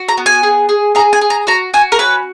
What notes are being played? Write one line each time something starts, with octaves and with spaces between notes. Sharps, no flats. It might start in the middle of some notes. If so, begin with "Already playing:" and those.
Already playing: F#4
A#5
B3
G#5
G#4
G#4
G#4 A#5
G#5
G#4
A#5
F#4 A#5
F#4 G#5
A#4
C#4 B4